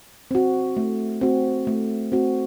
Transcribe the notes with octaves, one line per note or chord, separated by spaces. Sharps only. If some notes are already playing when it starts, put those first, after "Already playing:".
C4 F#4
A3
C4 F#4
A3
C4 F#4